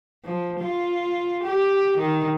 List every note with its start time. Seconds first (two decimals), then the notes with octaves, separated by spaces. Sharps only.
0.24 F3
0.61 F4
1.44 G4
1.98 D#3